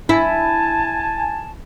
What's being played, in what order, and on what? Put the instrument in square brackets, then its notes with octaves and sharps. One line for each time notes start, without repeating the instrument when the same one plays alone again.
[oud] E4 [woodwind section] G#5 A5